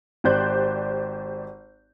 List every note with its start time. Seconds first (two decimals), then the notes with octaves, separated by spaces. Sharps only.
0.24 G#1 G4 C5 D5 F#6 G6